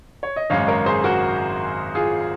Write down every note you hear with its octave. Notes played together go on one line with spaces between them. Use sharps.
C#5
D#5
G#1 F#2 C#3 G#3 C#5 F5
A#4 C#5
G#4 C5
F#4 A#4
F4 G#4